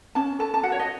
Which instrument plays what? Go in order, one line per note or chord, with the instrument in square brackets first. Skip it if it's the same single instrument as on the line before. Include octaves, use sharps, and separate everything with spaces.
[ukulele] C#4 A5
A4 A5
A5
F#4 F#5
C#5
D#5